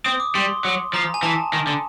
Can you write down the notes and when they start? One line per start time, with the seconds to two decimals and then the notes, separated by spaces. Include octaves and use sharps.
0.05 C4 D#6
0.20 D6
0.35 G3 C6
0.65 F#3
0.93 F3 A#5
1.14 G#5
1.23 E3 A5
1.53 D#3
1.67 D3